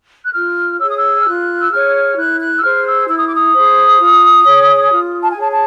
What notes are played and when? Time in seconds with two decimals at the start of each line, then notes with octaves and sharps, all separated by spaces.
0.24 F#6
0.34 F4 F6
0.80 G#4 C#5 E6
0.89 D#6
0.98 E6
1.20 F6
1.26 F4 F#6
1.60 E6
1.71 G#4 C#5 F6
2.17 E4 F#6
2.40 F#6
2.56 E6
2.63 G#4 C5 F6
2.85 E6
3.08 E4 E6
3.18 D#6
3.27 D6
3.36 D#6
3.54 G#4 C5
4.00 F4
4.45 G#4 C#5
4.91 F4
5.21 A5
5.31 G#5
5.37 G#4 C#5 A5
5.51 A5